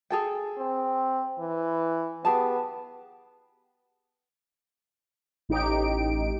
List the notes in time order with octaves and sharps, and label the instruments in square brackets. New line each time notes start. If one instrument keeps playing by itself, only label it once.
[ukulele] G#4 A4 G5
[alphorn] C4
E3
[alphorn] B3 [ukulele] G4 G#4 A5
[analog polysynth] A1 D#4 G4 D7